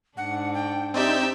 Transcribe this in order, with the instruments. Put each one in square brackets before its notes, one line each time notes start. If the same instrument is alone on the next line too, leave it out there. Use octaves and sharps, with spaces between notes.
[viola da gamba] G#2 D4 [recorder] F#5
[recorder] G5
[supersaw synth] C4 D#4 G6 [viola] G4 E5 [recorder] D5